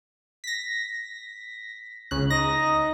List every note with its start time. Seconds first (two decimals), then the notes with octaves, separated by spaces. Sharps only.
0.44 A#6 B6
2.11 C#2 C#3 F#6
2.30 D#4 A#6